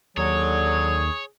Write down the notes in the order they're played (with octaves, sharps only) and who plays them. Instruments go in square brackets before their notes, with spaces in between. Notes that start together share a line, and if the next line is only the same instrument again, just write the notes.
[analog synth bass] D#2 [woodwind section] D3 F#3 [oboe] G#4 [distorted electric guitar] C#5